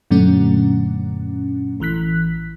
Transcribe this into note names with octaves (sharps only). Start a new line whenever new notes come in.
F#2 A#2 D3 F#3 A3 C#4
A1 E3 F#6 B6